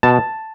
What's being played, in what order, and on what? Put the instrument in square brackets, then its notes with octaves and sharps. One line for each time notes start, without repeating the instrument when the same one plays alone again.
[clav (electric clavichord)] B2 A5